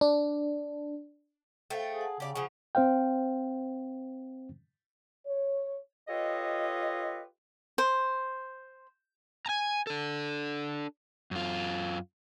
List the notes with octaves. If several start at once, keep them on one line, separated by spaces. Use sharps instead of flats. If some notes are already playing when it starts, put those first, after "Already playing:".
D4
A3 A4 C5 F5 G5
G#4
F#5 A5
C#3 G4 D5
C#3 F3 G#4 F#5
C4 C5 F5 G5
C#5
F4 G4 A4 B4 C#5 D#5
C5
G#5 A#5
D4 A4
F#2 F4